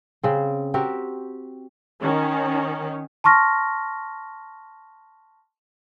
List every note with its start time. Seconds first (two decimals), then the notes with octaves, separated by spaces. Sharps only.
0.23 C#3 C4
0.74 C4 F#4 G4 A#4
2.01 D#3 C#4
3.24 A5 C6 C#6 F6 A#6